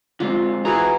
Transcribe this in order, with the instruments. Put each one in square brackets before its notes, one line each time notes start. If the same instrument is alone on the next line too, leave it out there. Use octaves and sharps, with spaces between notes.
[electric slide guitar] D3 G#3 C4 [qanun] F4
[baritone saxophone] E3 [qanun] F#4 [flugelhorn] G#4 [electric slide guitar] A#5